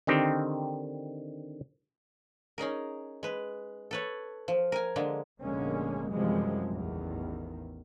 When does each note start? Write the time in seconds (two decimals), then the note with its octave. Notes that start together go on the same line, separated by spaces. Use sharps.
0.07 D3 D#3 C4 D#4 G4
2.58 C#4 D#4 G#4 A#4
3.23 G#3 B4
3.91 A4 B4 C#5
4.48 F3
4.72 A#4 G#5
4.96 D3 G#3 A#3
5.42 F1 A#2 D3 G#3 A#3 C#4
6.11 F#2 C3 E3 F3 G3 G#3
6.72 A1 E2 D#3